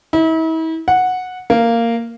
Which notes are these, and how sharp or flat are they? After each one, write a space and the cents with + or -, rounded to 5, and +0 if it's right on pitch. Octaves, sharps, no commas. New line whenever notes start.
E4 -40
F#5 -10
A#3 -10